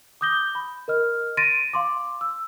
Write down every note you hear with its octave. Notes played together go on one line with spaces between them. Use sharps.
D6 D#6 G6 A#6 G7
B5
A#4 D#5 F6
C6 A6 A#6 D7 D#7
F5 C6 D6
E6